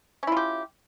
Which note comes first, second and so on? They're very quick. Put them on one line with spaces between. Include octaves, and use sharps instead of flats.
C#4 E4 F4 G4